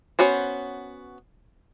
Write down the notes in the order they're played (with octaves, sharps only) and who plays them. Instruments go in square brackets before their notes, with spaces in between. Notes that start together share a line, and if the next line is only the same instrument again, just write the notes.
[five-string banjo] B3 C#4 F#4 C5